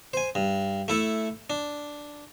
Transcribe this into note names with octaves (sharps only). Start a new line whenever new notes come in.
C5 G#5
G2
A3 E4 A4
D4